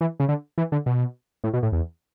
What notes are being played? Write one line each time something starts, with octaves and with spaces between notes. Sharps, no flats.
E3
C#3
D3
E3
D3
B2
A2
B2
A2
E2